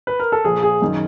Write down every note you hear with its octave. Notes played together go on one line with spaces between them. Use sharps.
B4
A#4
A4
A#2 F3 G#4
G#4
F#2 D#3